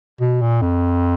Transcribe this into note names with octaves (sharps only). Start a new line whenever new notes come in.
B2
A#2
F2